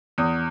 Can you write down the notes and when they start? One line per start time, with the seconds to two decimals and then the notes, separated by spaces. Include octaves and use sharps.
0.18 E2 D#6